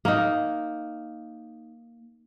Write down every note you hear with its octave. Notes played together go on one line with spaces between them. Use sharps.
A#3 D#4